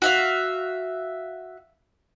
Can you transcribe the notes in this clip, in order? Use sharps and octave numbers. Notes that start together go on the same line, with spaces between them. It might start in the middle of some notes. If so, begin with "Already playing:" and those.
F#4 E5 F5